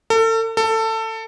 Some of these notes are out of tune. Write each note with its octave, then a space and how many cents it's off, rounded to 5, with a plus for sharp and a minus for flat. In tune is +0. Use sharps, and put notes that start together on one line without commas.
A4 +35
A4 +20